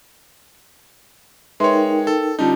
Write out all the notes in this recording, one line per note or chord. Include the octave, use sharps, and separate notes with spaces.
G#3 D#4 A#4 B4 C#5 E5 G5 C6
A4
D3 G3 C#4 D#4 F4 A5